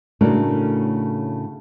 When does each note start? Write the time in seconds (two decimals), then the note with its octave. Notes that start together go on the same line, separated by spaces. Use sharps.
0.21 A2 C#3 A3 D4 F#4 A#4